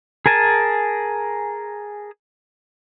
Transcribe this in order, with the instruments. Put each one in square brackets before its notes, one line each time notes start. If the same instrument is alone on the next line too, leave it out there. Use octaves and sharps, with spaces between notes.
[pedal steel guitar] G#4 A#4 G#5 A5